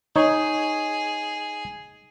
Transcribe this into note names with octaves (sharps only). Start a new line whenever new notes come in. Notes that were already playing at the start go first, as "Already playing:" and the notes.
D#4 G#4 C#5